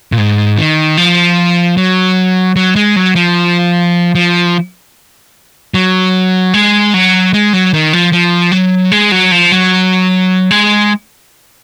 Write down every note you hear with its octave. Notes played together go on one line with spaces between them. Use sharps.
A#2
G#2
D#3
F3
F#3
F#3
G#3
F#3
F3
F3
F#3
G#3
F#3
G#3
F#3
D#3
F3
F3
F#3
G#3
F#3
F3
F#3
G#3